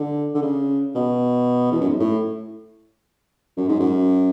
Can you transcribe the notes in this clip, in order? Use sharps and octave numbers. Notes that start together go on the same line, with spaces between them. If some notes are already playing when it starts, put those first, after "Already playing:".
Already playing: D3
D3
C#3
B2
E2
F#2
G#2
A2
F#2
G#2
F#2